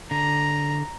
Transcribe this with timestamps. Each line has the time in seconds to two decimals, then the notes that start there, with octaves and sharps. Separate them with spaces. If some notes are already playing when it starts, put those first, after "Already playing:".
0.11 D3 A#5